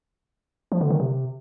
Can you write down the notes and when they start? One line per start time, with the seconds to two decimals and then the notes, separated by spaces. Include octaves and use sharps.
0.72 F3
0.81 D3
0.90 D#3
1.00 C3